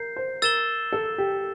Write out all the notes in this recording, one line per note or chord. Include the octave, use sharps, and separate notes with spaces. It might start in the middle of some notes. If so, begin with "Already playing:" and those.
Already playing: A#4 G6 C7
C5
A#4 E6 A6 E7 G7
A4
G4